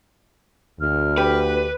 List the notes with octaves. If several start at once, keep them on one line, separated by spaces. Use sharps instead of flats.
D2 F6
G4 B4